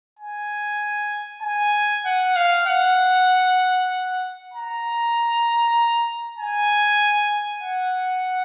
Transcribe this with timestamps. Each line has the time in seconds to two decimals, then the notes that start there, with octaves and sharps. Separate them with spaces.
0.19 G#5
1.42 G#5
2.05 F#5
2.36 F5
2.66 F#5
4.54 A#5
6.39 G#5
7.63 F#5